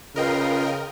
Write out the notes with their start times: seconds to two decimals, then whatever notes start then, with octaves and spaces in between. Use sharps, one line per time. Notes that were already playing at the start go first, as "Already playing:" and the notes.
0.16 C#3 F4 A#4 B4 D#5 F5 G5